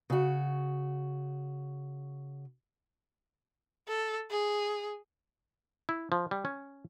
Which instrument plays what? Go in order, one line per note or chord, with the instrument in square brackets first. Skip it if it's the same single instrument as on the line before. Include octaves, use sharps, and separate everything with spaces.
[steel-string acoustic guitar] C#3 F#4
[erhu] A4
G#4
[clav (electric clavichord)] E4
F3
G3
C#4